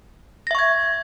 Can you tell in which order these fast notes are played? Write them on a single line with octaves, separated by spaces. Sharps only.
A#6 E5 C#6 G#6